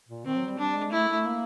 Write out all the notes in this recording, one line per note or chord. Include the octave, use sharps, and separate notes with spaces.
A#2
D#3 C4
F#3
G3
G3 D4
G#3
A3 E4
A3
A#3